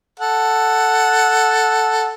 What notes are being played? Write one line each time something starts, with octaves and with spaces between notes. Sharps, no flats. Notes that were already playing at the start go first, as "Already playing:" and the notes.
A4 F#5